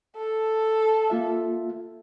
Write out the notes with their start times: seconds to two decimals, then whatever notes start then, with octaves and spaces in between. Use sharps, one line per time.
0.17 A4
1.10 A#3 F4 E5